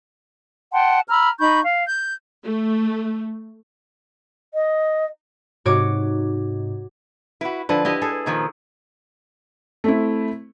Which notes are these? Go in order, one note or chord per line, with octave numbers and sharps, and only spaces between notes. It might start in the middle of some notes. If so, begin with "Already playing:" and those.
F#5 G5 A5 C6
A#5 B5 E6 F6
D#4 B5 C#6 G6
F5
G6
A3
D#5
G#2 C3 D#4 F#4 C#5 D6
E4 F#4 B4
D3 F3 E4 B4
E4 G4 D#5
G#4 A4
A#2 D#3 F3
A3 C4 E4